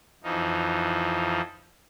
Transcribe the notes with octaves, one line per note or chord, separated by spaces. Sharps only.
F2 E3 F3 D#4